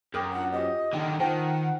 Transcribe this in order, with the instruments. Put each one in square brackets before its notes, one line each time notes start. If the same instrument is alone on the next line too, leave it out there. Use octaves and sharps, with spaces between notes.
[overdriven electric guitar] F#2 [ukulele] A#4 C#5 G5 [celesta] D6 D#6 G6
[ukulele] D4 F4 A#5 [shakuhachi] F#5
[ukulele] F4 G4 C5 [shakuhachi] D#5
[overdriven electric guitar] D3 D#3 [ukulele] D4 F#5
[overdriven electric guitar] D#3 [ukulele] F4 G5 A5 [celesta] C5 [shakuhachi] F#5